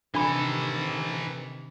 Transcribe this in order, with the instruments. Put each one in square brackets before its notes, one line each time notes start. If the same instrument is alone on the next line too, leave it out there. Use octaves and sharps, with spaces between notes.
[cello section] C3 D#3 [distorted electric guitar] E3 A4 [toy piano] D4 B5